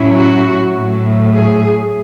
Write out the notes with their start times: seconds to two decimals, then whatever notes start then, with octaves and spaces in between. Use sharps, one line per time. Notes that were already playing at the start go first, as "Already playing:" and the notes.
Already playing: A2 F#3 C#4 E4
0.15 F#4
0.74 A2 F#3 A3
1.34 G#4